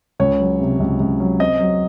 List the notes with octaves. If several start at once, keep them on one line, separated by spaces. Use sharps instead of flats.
C#2 C#5
F#3
C3
C#2
C#2
F#3
C4 D#5
F#3